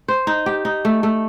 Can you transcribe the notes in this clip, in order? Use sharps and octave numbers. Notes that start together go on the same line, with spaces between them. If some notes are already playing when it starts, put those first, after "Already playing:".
C5
D#4
G4
D#4
A3
A3